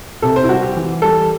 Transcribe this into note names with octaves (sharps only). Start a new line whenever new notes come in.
C3 A4
C5
E4
G3 F#4
G4
E3
G3 A4